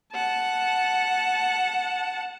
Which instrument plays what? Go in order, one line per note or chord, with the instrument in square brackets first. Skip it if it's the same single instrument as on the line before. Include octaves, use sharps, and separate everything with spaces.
[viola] F#5 A5